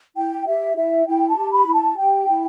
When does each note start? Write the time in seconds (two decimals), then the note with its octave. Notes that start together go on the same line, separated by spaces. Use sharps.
0.16 E4 G5
0.47 G4 E5
0.77 E4 E5
1.07 E4 G5
1.29 A5
1.37 G4
1.52 B5
1.66 E4
1.74 A5
1.97 G4 G5
2.27 E4